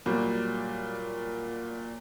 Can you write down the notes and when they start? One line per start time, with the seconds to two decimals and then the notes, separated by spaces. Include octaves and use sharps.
0.06 A#2 F#3 G3